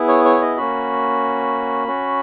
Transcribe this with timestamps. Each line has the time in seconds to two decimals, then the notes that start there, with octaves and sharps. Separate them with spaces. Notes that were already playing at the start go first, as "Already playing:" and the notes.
Already playing: B3 E4 G#4
0.08 C#5
0.25 C#5
0.42 D#5
0.57 A#3 C#4 F#4 B5
1.87 C#4 F#4